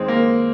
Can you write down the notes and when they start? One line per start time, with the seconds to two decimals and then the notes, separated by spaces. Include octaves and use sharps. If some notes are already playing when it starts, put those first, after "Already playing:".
Already playing: D#2 D#3 G#3 C4
0.08 A#3